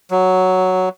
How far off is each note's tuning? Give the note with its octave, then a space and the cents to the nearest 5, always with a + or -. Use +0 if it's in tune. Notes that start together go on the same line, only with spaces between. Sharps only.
F#3 +0